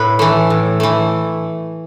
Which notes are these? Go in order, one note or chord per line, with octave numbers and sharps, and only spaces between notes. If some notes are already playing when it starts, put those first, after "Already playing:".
Already playing: A2 B4
E3 A3
A2
E3 A3